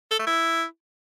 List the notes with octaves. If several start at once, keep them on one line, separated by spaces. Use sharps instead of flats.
A4
A3
E4